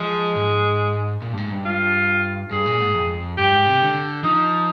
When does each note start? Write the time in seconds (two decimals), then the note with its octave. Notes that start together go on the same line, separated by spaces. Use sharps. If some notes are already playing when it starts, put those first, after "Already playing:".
Already playing: F3 G#3
0.36 G#2
1.22 A#2
1.33 G2
1.37 G#2
1.51 G2
1.65 F4
2.51 G2 G#4
2.66 A#2
2.80 G#2
2.94 F2
3.38 G2 G4
3.52 G#2
3.66 C3
3.81 D3
4.24 F3 D#4